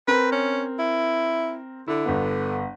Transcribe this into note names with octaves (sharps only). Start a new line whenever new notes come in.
C4 A#4 B4
C#4
E4
D3 E4
G1 B3